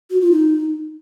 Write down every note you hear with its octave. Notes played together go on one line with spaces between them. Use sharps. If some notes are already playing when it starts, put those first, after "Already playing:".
F#4
F4
D#4